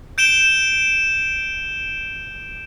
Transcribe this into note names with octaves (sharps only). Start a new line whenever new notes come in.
G6 D7 E7 G7